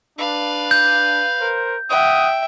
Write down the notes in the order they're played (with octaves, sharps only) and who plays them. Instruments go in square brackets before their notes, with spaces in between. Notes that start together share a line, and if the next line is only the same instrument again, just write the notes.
[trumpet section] D4 [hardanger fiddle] B4 F5
[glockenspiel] G6
[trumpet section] A#4 C5
[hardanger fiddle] E5 G5 [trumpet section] F#5 D#6